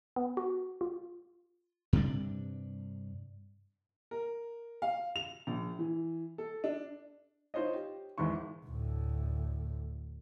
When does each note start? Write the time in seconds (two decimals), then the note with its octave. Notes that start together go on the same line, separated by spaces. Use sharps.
0.16 B3
0.37 F#4
0.81 F4
1.93 G2 C3 D4
4.11 A#4
4.82 F5
5.16 F7
5.47 A#1
5.79 E3
6.38 A4
6.64 D4
7.54 D#4 F4 C5 C#5 D#5
7.74 G4
8.18 G#1 E2 G#2 E3 C#6
8.66 D2 A2